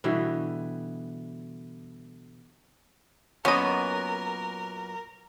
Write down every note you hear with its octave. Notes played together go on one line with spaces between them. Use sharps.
B2 D3 E3 G3
F#2 A#2 B3 C#4 A#4 D#5